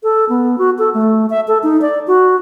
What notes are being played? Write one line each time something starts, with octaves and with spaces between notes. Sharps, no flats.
A4
B3
F#4
A4
A3
E5
A4
D#4
D5
F#4